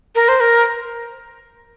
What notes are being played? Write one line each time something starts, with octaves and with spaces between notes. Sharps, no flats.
A#4
C5
A#4